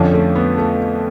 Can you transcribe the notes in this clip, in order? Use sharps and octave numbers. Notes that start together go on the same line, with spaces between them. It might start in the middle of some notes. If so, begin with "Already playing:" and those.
Already playing: F2 D3 F3 C#4
A3
B3
A3